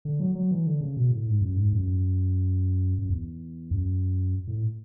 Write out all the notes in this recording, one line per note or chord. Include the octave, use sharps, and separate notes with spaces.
D3
F#3
F#3
E3
D3
C#3
B2
A2
G#2
F#2
G#2
F#2
F#2
E2
F#2
A2